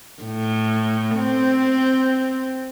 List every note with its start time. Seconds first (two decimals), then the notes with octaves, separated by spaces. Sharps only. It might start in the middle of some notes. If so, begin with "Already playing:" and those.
0.22 A2
1.17 C4